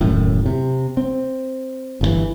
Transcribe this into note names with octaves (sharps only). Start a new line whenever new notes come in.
E1 F#2 A2 D#3
C3
C4
G1 C#3 E3